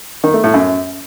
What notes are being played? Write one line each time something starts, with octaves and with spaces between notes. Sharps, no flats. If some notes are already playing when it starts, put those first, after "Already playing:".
D#3
A3
A2
F#2